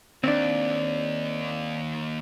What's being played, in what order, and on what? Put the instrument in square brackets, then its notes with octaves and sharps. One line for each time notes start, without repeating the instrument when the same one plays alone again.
[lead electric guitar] D#2 [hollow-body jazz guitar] C4 D4